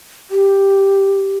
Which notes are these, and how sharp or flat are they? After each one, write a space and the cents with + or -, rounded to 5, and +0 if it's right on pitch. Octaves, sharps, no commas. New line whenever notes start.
G4 +0